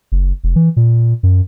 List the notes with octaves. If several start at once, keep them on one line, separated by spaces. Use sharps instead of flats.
F#1
F1
E3
A#2
F#2